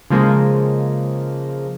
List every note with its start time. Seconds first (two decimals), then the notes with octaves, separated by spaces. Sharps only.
0.10 C#3 F3 G#3 A#3